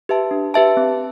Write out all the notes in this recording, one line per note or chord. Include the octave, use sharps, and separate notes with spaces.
G4 B4 E5 A5
D4
G4 B4 E5 A5
C4